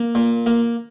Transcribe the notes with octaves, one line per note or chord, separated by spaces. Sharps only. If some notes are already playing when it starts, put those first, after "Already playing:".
Already playing: A#3
A#2
A#3